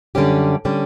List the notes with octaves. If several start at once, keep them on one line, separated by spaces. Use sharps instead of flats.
F#2 D3 G3 C#4 G4
D3 G3 C#4 G4